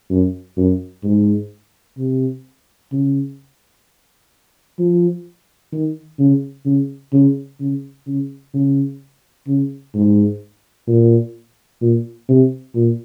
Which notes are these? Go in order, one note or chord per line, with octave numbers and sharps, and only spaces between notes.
F#2
F#2
G#2
C3
C#3
F3
D#3
C#3
C#3
C#3
C#3
C#3
C#3
C#3
G#2
A#2
A#2
C3
A#2